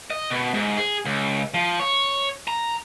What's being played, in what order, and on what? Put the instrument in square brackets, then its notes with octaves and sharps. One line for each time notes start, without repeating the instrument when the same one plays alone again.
[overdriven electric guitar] D#5
B2
G#2
G#4
C#2
F3
C#5
A#5